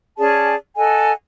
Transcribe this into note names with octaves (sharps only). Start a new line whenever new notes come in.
C#4 G#4 D5 A5
A4 D#5 F#5 G#5